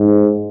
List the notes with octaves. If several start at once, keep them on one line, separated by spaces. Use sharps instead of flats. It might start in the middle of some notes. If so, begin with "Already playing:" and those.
Already playing: G#2